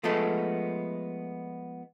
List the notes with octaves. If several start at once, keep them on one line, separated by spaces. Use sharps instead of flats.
F3 G#3 A3 B3 A4